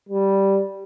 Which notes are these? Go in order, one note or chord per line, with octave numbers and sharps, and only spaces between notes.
G3